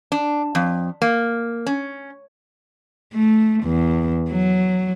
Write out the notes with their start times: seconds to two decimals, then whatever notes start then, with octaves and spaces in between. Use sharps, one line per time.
0.12 D4
0.55 F2
1.02 A#3
1.66 C#4
3.13 A3
3.64 E2
4.30 F#3